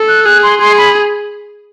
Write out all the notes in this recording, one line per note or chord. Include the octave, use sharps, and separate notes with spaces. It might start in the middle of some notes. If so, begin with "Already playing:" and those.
Already playing: A4
F#6
G#4 F#6
C6
G#4 C6
B5